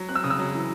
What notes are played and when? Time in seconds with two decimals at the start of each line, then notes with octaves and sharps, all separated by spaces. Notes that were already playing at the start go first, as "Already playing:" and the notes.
Already playing: F#3
0.09 C4 F#6
0.15 E6
0.24 C#3 D#6
0.30 E6
0.39 F#3
0.54 E3